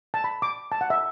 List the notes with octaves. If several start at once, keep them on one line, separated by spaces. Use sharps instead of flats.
A5
B5
D6
A5
F#5
E5